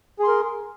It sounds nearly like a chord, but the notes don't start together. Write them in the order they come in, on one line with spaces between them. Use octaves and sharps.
G#4 C6 A#4